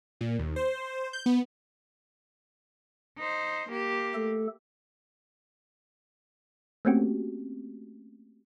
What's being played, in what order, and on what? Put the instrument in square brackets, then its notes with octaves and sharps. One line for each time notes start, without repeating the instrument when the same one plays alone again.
[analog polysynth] A#2
D#2
C5
G6
B3
[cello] D#4 C5
A#3 G4
[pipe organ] A3 A4
[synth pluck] A3 A#3 C4 C#4 F#4 G4